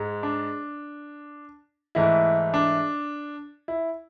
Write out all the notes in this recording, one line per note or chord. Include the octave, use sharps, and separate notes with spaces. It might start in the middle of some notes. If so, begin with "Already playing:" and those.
Already playing: G#2 G#3
D4
G#2 E3 A3 E4
D4
E4